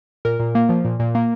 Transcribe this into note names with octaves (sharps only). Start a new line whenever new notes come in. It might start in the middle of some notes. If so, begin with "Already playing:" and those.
A#2 A#4
A#2
A#3
F3
A#2
A#2
A#3